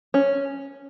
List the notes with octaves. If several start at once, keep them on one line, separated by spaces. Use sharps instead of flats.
C#4